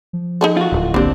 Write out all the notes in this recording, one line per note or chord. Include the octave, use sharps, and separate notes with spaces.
F3
D#4 G#4 A4
F4 F#4
D1
A#1 D3 A#3 C4 D4 G4